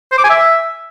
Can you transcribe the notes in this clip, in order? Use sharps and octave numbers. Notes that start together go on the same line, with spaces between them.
C5
D6
G#5
E5